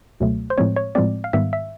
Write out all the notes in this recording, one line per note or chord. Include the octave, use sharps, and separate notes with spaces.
C#2 B2 F#3 A3
C5
A2 F3 G#3 C4 C#5
C#5
A2 F3 G#3 C4 D5
F5
G#2 D#3 G3 B3 E5
E5